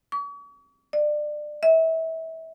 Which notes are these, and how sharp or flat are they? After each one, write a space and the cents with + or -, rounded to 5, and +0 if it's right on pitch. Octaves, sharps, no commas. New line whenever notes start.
C#6 +45
D5 +25
E5 -30